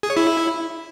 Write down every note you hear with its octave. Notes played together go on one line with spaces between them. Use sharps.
G#4
C#5
E4